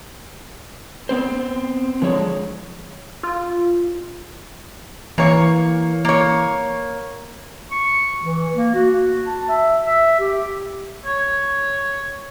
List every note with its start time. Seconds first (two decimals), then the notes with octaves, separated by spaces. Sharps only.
1.09 B3 C4 C5
2.02 D3 F3 G#3 C#5
3.23 F4
5.18 E3 A#3 C#5
6.05 A#3 C#5
7.71 C#6
8.21 E3
8.53 A#3
8.74 F#4
9.26 A5
9.49 E5
9.85 E5
10.19 G4
11.06 C#5